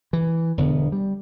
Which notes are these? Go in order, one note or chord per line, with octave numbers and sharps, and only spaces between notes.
E3
E1 D3 B3
G3